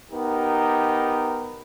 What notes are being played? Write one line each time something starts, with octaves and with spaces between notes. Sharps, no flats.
B3 D#4 G4 A#4